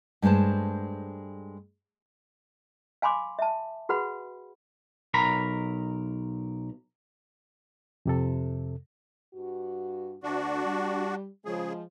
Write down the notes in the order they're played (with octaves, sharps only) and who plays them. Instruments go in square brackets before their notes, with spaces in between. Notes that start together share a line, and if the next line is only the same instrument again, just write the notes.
[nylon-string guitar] G2 G#3 A3 C5 A5
[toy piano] F5 G#5 B5 C6 D6
E5 A5
F#4 G#4 B4 F#5 B5
[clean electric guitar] B1 A#4 A#5 B5
[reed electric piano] F2 C3 A4
[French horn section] G2 F#4
[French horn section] D2 [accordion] D4 F#4
[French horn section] G3
[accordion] C#3 G#4 [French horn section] F3 G#3